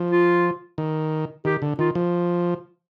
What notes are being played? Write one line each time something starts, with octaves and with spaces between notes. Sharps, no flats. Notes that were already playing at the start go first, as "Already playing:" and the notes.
Already playing: F3
F4
D#3
D#3 G4
D3
D#3 F4
F3